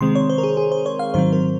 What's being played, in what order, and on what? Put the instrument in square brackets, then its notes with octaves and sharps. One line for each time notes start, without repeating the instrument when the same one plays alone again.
[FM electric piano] C3 D#3 G#3 C4 C6
C#5
C5
A#4
G#4
G#4
C5
C#5
F5
G#2 D#3 F#3 C4 C5
A#4